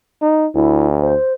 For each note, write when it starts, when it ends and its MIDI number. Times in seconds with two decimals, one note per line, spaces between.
0.21 0.46 63
0.54 1.14 38
0.54 0.86 64
1.02 1.33 72